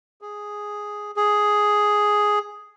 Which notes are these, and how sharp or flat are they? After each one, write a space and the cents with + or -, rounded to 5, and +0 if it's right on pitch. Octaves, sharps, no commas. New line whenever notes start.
G#4 +0
G#4 +5